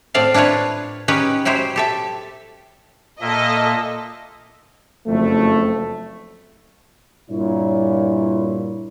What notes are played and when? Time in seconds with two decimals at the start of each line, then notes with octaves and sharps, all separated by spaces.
0.14 A2 C4 F4 D5 F5 A5
0.34 D4 E4 F4 B4 C#5
1.08 C#4 D#4 G4 B4 C#5
1.45 F#3 E4 G4 C5 C#5
1.76 G4 A4 E5
3.21 A#2 A#3 A4 D#5 E5
5.07 F#1 F2 A3
7.31 G2 A#2 E4 C#5